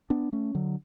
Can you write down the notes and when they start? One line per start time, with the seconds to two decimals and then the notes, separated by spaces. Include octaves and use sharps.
0.10 B3 D4
0.33 A3 C#4
0.55 D3 F#3